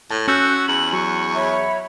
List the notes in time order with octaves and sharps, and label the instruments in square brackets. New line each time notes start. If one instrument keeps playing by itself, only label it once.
[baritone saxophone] A2 [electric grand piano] A5
[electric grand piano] C#4 E6 F#6 [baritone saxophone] F#4 [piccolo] G6
[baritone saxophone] E2 [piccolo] F#7
[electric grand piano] F#3 [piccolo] C#6
[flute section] C#5 E5 B5